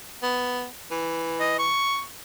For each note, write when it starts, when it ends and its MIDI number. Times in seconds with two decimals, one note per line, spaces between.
0.23 0.67 59
0.91 1.70 52
1.40 1.58 75
1.59 2.02 85